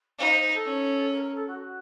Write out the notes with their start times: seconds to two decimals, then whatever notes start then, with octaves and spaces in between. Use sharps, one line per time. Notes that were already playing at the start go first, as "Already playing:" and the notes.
0.19 D#4 F5
0.30 C5
0.42 C5
0.54 A4
0.65 C#4
1.12 A#4
1.23 A#4
1.34 A4
1.47 F#4